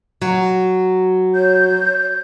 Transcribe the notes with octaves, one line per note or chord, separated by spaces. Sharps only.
F#3
C#5 G6